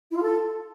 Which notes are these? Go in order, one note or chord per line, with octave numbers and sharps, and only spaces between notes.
E4
F4
A4